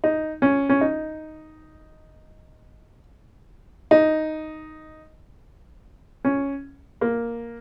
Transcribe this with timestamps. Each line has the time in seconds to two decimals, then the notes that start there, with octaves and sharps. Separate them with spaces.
0.04 D#4
0.42 C#4
0.69 C#4
0.81 D#4
3.91 D#4
6.25 C#4
7.01 A#3